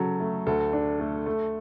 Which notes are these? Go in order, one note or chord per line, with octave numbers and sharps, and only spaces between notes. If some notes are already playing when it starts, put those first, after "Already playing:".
Already playing: C#3 F#3 A4
A3
D2 A4
D4
A3
A3